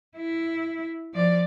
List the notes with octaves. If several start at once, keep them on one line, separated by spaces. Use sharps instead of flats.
E4
F3 D5